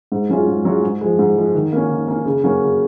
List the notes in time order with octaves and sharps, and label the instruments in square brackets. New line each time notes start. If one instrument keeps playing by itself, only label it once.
[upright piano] G#2
F#3 C#4 F4 G#4
G#2
F#3 C#4 F4 G#4
G#2
F3 G#3
G#2
F3 G#3
D#3
A#3 C#4
D#3
A#3 C#4
C#3
F#3 A#3 C#4 F#4
C#3